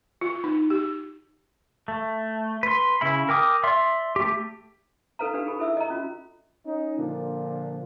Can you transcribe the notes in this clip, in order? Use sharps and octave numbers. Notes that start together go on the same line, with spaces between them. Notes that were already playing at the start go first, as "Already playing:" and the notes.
F4
D#4
G4
A3
B4 C6
C#3 E4 E5 B5
A#4 G5 D6 D#6
D5 E5 C6
A3 G4
D#4 A4 B4 F5 A#5
D4 G4 B4 F5
D#4 G#4 A4 B5
E4 A4 E5 D#6 E6
D#5 A#5
C#4 F4 F#4
C#4 D#4
A#2 D3 F3 A#3 D4